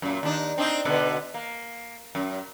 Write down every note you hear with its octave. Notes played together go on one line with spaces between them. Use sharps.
F#2 A#2
D#2 D4 D#4
C4 D4 D#4
B2 D3 B3
A#3
F#2